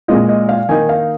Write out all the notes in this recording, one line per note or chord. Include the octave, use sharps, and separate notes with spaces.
A#2 G#3 F4 D#5
D#5
F5
D#3 A#3 D#4 G#5
F5